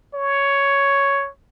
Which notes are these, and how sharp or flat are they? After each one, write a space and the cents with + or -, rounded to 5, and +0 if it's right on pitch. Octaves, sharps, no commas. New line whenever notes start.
C#5 +5